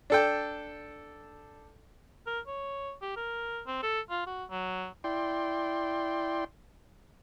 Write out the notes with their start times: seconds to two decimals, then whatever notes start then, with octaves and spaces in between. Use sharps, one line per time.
0.10 D4 A4 G5
2.27 A#4
2.47 C#5
3.02 G4
3.16 A#4
3.67 C4
3.83 A4
4.10 F4
4.27 F#4
4.50 F#3
5.04 E4 D5 G5 C6